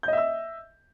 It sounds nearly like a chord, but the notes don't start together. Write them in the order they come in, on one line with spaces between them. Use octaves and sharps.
G6 D#5 E5 E6